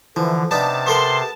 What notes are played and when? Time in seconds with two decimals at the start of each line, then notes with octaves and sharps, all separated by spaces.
0.16 D3 E3 F3
0.51 C3 B3 D4 D#4 A5
0.86 B3 A4 A#4 C6